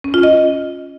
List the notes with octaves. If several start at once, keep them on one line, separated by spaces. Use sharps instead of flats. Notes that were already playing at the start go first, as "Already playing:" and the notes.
C#4
F4
D#5